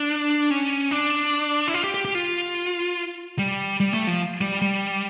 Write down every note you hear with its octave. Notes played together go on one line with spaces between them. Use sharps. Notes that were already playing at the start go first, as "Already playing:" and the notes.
Already playing: D4
C#4
D4
E4
F4
G4
G4
G4
F4
G3
G3
A3
F3
G3
G3